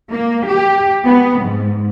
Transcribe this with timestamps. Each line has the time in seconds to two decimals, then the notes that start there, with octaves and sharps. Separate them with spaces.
0.13 A#3
0.49 G4
1.04 B3
1.42 G#2